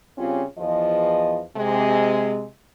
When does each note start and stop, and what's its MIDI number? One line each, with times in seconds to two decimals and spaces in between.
0.18 0.43 49
0.18 0.43 55
0.18 0.43 60
0.18 0.43 61
0.18 0.43 65
0.59 1.40 40
0.59 1.40 53
0.59 1.40 75
1.57 2.45 48
1.57 2.45 56